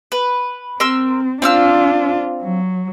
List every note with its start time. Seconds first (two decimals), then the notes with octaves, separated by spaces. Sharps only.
0.12 B4
0.80 C4 A#4 C6 E6
1.42 C4 D4 F4 F5 E6
2.43 F#3